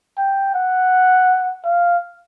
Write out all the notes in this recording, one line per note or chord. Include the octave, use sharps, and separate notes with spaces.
G5
F#5
F5